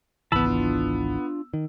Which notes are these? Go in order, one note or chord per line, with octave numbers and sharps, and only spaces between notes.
G#1 C#2 E3 B3 A5 B5 E6
D4 F4
D#3